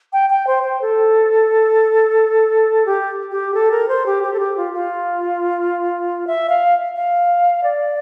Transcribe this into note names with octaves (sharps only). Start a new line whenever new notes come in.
G5
G5
C5
C5
A4
G4
G4
A4
A#4
C5
G4
G4
A4
G4
F4
F4
E5
F5
F5
D5